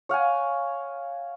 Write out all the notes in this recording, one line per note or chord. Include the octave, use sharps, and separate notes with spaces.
C#5 F5 F#5 G#5